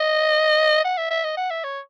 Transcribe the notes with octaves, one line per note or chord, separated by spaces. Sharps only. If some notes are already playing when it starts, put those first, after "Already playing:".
Already playing: D#5
F#5
E5
E5
D#5
F#5
E5
C#5